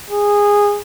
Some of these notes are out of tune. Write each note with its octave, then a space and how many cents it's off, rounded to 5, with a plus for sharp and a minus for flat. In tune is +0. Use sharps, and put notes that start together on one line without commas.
G#4 -15